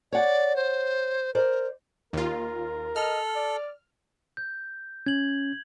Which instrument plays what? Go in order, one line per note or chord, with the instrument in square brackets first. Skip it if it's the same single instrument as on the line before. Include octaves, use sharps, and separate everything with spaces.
[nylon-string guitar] C#5 F#5 [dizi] D5
[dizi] C5
[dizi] A#4 [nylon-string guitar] C5 D5
[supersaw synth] D#2 F4 [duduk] A#4
[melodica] A4 [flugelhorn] D#5 [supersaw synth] F6
[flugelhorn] D5
[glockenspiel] G6
[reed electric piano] C#4 [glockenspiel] G#6 F#7